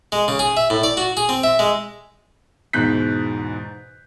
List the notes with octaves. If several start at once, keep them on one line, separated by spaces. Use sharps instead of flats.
G#3
C#3
G#4
E5
A2
D5
F#4
G#4
C4
E5
G#3
E2 G#2 B2 F#6 G6 B6